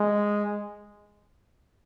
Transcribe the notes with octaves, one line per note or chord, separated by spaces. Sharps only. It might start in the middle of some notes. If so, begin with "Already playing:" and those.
Already playing: G#3